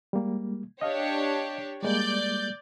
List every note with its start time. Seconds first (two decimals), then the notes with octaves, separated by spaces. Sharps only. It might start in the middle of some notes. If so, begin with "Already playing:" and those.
0.13 G3 G#3 A#3
0.81 D4 G4 C#5 D#5 F5
1.83 G3 G#3 A#3 D5 G6